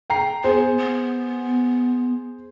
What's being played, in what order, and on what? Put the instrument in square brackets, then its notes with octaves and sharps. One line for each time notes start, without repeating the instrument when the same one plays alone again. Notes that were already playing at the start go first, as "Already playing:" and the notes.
[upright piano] G5 A#5 C7
[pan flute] B3 [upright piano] G#4 C5
[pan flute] B3